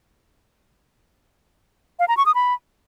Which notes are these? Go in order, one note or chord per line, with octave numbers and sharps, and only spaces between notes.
F5
A#5
C#6
D#6
B5